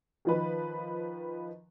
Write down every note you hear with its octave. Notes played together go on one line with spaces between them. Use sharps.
D#3 F3 B4